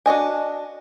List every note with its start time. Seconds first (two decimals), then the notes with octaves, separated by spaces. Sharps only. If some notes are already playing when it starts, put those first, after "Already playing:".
0.06 D4 F#4 D#5 G#5